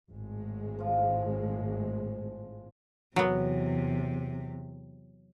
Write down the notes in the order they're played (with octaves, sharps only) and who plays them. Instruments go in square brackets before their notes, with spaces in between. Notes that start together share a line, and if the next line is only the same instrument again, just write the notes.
[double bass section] G#1 A2 G#3
[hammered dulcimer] F3 F4
[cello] E2 C3 [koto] F#3 B3